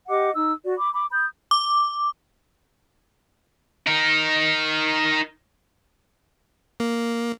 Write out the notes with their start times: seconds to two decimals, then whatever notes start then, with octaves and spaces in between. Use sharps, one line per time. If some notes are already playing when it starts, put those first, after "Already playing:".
0.08 G4 D#5 F#5 D6
0.34 D#4 E6
0.63 F#4 D5
0.77 B5 D6
0.93 B5 D6
1.11 B5 D#6 G6
1.51 D6
3.87 D#4 A#4
6.80 A#3